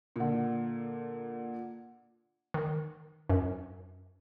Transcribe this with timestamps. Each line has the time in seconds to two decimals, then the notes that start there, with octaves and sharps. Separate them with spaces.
0.16 A#2 D3
2.54 D#3
3.30 F#2